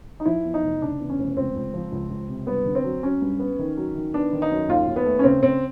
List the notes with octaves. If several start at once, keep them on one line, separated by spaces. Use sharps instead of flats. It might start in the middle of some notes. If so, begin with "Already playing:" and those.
D#4
F3 E4
E2
D#4
F1
C#3 D4
E2
C#4
F1
C#2 C4
C#2
F3
C#2
C#2
C3
G2 B3
D3
C4
F#3
F#3 C#4
G2
B3
D#3
F#3
D#3
B3 D4
D#3
D#4
F#2
D#2 F4
D#2
B3
A3
C#4
C#3 C4
C#3 C4